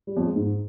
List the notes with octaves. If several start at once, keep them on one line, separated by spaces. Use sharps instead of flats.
G3
F2
G#3
G#2